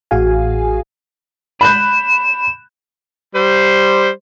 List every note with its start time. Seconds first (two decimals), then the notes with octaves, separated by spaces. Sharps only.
0.11 A1 A2 F#4 G#4 F5 G#5
1.61 B5 F#6 G6 E7
3.35 G3 C5